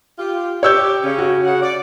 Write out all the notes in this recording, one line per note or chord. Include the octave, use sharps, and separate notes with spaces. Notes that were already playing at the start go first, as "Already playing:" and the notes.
F4 G4
G4 C#5 E6 G6
C#3 C#4
F#4
C#3 F#5
D5